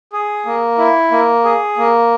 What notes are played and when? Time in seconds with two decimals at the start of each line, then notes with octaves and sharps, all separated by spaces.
0.13 G#4
0.46 A#3
0.78 E4
1.11 A#3
1.44 G#4
1.78 A#3